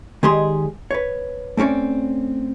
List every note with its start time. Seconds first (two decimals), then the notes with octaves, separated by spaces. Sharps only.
0.23 D#3 G#3 G4 G#4 D5 C6
0.91 B4 C#5
1.57 A3 C4 C#4 C#5 D5